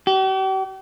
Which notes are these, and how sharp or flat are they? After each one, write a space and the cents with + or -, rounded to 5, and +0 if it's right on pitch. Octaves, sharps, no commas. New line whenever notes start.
G4 -45